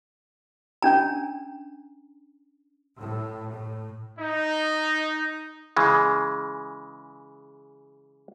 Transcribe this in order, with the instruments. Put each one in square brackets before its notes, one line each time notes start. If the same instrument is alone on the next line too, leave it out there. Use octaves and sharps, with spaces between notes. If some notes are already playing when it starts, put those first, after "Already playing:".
[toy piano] C#4 D4 A#5
[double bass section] A2
A2
[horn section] D#4
[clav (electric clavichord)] C#3 E3 G#3